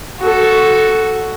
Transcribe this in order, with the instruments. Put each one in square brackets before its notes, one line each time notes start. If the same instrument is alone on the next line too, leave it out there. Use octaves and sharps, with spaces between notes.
[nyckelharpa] F#4 A4